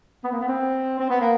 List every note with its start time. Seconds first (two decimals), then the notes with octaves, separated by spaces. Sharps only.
0.24 B3
0.32 A#3
0.41 B3
0.48 C4
1.00 C4
1.10 B3
1.21 A#3